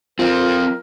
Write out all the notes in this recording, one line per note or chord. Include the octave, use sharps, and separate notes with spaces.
F3 C4 F4 A#4